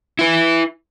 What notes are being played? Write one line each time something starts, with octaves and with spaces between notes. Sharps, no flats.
E4 B4